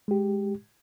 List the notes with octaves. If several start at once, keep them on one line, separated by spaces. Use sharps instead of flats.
G#3 G4